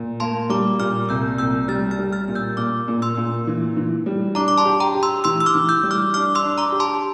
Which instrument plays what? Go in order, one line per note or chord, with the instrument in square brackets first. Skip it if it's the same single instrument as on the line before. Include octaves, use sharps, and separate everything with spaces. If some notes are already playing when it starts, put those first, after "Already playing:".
Already playing: [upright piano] A#2
[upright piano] A#3 [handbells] A5 C6
[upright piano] G3 [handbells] A#5 D6
[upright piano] A#2 [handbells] D6 F6
[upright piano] C2 [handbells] E6 G6
[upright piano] C2 [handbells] E6 G6
[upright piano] G3 [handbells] F6 A6
[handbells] F6 A6
[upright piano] G3
[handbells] F6 A6
[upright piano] A#2
[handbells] E6 G6
[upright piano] A#2 [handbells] D6 F6
[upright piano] A#2
[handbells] C6 E6
[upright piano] A#2
E3
E3
G3
[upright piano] D4 [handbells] A#5 D6
[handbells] D6
A5 C6
[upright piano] G4
[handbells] G5 A#5
[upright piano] G4
[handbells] C6 E6
[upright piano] E3 [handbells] C6 E6
[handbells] E6
D6 F6
[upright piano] E3
[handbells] E6 G6
[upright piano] G3
[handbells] D6 F6
[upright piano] D4 [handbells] D6 F6
[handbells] C6 E6
[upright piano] D4
[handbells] A#5 D6
[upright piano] G4
[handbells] A5 C6